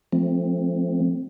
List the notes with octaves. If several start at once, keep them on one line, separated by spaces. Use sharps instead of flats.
F3 A3 C4